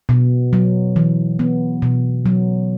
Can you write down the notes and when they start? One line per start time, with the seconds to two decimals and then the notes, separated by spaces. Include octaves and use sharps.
0.09 B2
0.53 F#3
0.96 E3
1.39 B3
1.82 B2
2.26 F#3